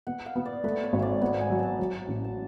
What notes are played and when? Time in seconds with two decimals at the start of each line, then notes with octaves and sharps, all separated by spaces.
0.07 B3 F#5
0.26 F5
0.36 B3
0.45 D5
0.64 A3 B4
0.83 C#5
0.93 G#1
1.02 D5
1.21 B3 F#5
1.41 G#5
1.50 F#3
1.60 A5
1.79 F#3
2.08 A1
2.24 A5